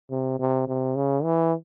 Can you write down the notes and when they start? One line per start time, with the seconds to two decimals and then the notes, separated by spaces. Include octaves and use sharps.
0.10 C3
0.39 C3
0.68 C3
0.95 C#3
1.23 E3